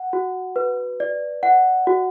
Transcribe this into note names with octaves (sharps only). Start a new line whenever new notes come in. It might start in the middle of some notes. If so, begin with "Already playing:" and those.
Already playing: F#5
F#4
B4
D5
F#5
F#4